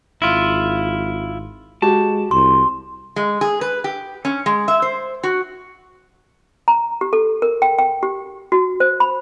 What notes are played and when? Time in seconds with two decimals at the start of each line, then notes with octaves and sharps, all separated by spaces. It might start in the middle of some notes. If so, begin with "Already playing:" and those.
0.22 G#1 E4 F4
1.82 G#3 F#4 G4 A5
2.31 C2 C6
3.16 G#3
3.41 G#4
3.61 B4
3.84 G4
4.25 C#4
4.46 G#3
4.68 E5
4.82 C5
5.23 F#4
6.68 A#5
7.01 G4
7.13 A4
7.42 A#4
7.62 G5
7.79 G5
8.03 G4
8.52 F#4
8.80 C5
9.00 B5